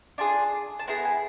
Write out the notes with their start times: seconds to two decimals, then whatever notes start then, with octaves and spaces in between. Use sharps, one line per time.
0.18 D4 F4 G#4 A5
0.79 A5
0.87 B3 E4 G#4 A#5
1.05 G#5